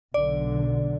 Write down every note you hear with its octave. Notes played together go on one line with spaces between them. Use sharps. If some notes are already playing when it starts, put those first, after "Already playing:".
B1 D3 D5